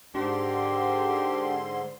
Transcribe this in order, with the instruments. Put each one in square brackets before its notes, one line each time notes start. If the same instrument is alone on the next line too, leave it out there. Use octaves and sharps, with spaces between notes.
[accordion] G#2 D3 C6 [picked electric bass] D4 [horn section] G4 A#4